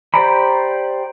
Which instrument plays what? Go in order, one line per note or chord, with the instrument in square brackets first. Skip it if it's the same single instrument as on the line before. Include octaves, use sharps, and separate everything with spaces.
[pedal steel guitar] G4 C5 D5 A#5 B5